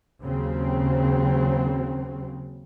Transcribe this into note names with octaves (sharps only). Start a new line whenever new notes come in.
D#2 C#3 F#3 C4